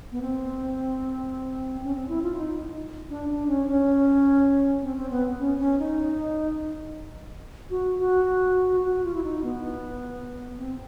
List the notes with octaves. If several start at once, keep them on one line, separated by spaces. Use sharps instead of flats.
B3
C4
C#4
C4
E4
F4
D#4
D4
D4
C#4
C#4
C4
C4
B3
C#4
C#4
D#4
F#4
F#4
F#4
F4
E4
D#4
B3
C4